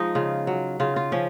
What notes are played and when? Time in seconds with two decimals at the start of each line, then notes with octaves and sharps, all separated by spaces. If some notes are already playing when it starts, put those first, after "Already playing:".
Already playing: F3 G#3 D#4
0.15 C#3 F4
0.47 F#3
0.80 C#3 F4
0.96 F4
1.12 F3 C#4